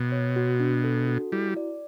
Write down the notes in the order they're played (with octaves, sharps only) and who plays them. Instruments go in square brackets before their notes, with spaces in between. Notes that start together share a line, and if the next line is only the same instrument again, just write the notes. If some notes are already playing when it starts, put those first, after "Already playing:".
Already playing: [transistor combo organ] B2
[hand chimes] C#5
F#4
D4
A4
F#4
[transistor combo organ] G3 [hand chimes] E4
[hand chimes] D5